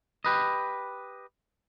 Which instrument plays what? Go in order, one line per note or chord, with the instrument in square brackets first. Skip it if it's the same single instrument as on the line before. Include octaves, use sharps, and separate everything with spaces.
[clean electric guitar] G4 B4 D#5